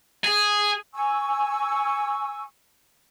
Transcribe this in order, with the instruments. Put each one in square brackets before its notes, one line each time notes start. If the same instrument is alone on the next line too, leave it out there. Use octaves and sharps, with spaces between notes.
[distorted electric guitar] G#4
[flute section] G#5 C#6 E6